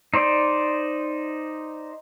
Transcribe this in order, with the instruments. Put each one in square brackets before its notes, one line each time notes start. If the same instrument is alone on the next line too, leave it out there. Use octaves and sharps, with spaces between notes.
[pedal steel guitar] D#4 C5 D5